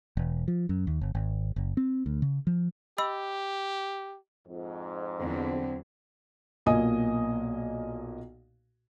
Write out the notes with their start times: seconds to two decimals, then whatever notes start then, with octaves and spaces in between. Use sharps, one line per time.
0.17 E1
0.48 F3
0.69 F#2
0.87 D#2
1.01 G1
1.15 G#1
1.56 F#1
1.77 C4
2.06 D2
2.22 C#3
2.47 F3
2.98 G4 D#5 B5 E6
4.47 F2 G#2
5.20 E2 D3 F#3 C4
6.66 B1 A#2 A#3 D#5 G#5 D#6